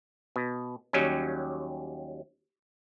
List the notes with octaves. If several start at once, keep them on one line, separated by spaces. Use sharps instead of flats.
B2
D#2 F#3 G3 C#4